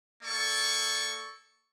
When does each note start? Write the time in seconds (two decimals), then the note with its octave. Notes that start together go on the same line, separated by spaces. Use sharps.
0.22 A#3 A4 D5 C#6